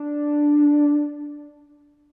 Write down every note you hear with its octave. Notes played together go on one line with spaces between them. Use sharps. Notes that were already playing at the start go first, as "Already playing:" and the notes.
Already playing: D4